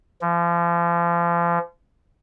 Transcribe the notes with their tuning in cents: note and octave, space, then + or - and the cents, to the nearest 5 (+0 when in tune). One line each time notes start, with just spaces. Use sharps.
F3 -35